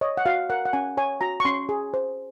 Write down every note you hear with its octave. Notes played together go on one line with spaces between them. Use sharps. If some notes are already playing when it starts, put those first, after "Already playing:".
C#5 D#5
F#5
F#4 F5
A#4 F#5
F#5
C#4 G#5
C#5 G#5
F#4 A#5
C#6
C#4 C6
G#4
C5